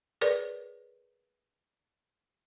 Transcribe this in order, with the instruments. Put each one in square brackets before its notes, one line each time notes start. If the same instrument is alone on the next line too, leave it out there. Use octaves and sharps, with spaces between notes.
[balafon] G#4 A#4 B4 C#5 D5